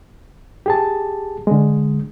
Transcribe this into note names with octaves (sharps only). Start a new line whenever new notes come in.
G4 G#4 A5
D3 G#3